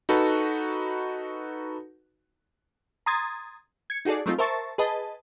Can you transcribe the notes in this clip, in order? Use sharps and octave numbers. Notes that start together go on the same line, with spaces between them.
D#4 F#4 A4 B4
A#5 C6 D#6 G#6 A6
G#6 C#7
D#4 F#4 G#4 A4 D5
F#3 G#3 A3 C4 D#4 F4
A#4 C5 E5 A5 C#6 A6
G#4 B4 D#5 A5